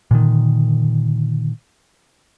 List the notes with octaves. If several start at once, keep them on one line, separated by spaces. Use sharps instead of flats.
A#2 D3 D#3